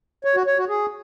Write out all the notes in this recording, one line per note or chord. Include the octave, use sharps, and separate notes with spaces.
C#5
F#4
C#5
F#4
G#4